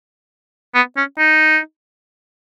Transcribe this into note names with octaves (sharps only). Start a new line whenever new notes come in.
B3
C#4
D#4